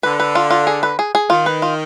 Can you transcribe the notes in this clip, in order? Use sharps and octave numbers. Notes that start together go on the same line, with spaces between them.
D3 B4
B4
F4
F4
G#4
B4
G#4
G#4
D#3 F4
B4
F4